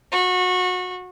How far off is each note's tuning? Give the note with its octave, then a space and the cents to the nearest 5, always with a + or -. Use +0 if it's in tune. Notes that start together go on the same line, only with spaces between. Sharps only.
F#4 -25